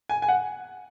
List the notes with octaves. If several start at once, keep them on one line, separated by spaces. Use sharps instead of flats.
G#5
G#5
F#5